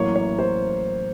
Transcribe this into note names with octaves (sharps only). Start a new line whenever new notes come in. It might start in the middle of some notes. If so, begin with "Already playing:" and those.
Already playing: A1 A2 F#3 A#3 C#5
C#5
C5